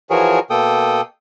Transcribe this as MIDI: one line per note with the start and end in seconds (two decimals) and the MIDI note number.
0.10 0.39 52
0.10 0.39 53
0.10 0.39 66
0.10 0.39 68
0.10 0.39 70
0.10 0.39 73
0.50 1.01 47
0.50 1.01 58
0.50 1.01 69
0.50 1.01 79
0.50 1.01 87